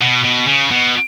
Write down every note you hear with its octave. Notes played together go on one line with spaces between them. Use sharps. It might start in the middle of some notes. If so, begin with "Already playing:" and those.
B2
B2
C#3
B2